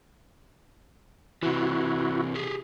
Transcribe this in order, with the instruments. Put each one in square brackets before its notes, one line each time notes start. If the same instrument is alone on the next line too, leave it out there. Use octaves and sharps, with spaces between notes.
[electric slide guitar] C3 E3 [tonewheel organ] E4 F#4
[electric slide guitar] G4 G#4